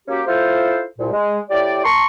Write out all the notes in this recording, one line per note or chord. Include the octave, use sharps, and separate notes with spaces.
A#3 C#4 F#4 G4
E4 F4 A4 C5
C2 A#2
G#3
A2 G4 D5
A5 A#5 C6 C#6